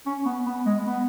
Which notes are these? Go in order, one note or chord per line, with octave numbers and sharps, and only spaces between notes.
C#4
B3
B3
G#3
B3